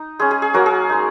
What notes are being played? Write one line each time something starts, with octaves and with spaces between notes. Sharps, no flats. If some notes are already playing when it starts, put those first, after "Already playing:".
Already playing: D#4
G#3 C#4 G#4
G#4
G#4
F#3 A#3 C#4 F#4 A#4
G#4
G#3 D#4